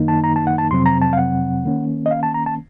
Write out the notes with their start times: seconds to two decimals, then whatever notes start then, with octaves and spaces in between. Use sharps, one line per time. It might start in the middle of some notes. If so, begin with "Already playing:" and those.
Already playing: F#2 D#3 A#3 D#4
0.08 A5
0.24 A#5
0.36 A5
0.47 F#5
0.58 A5
0.71 F2 C3 F#3 C4 C6
0.86 A#5
1.02 A5
1.13 F5
1.17 F#5
1.64 D#3 A#3 C#4
2.06 D#5
2.11 F5
2.23 A5
2.34 A#5
2.46 A5